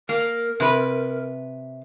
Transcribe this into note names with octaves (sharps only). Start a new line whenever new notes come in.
A#3 A#4
C3 B4